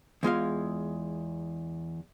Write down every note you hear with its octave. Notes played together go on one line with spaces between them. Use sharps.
E2 G#3 F4 F5